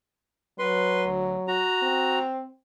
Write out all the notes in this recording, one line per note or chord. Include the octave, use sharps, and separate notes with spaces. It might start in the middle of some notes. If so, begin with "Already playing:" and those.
F#3 B4 C6
D2
F#4 A#5
C4